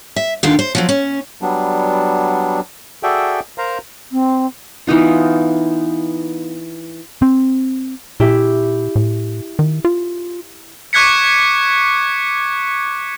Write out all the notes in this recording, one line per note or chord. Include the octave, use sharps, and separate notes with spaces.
E5
D#2 D3 D#3 F4 F5
C5
F3 F#3 C4
C#4
F#3 G3 B3 D4
F#4 G#4 A4 D5 E5 G5
A#4 C5 F5 A#5
C4
E3 B3 D#4 F4
C4
A#2 E4 G4
A2
D#3
F4
C#6 D6 F#6 G#6 B6 C#7